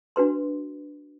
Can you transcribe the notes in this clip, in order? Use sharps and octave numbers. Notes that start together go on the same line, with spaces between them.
D4 F#4 B4 C6